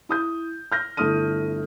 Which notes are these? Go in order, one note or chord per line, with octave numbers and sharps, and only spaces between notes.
E4 D#6 G6
F6 G6 A#6
G1 A3 E4 D#6 F6 D#7